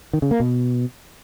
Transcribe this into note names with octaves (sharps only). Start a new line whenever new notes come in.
D#3
C#3
A#3
B2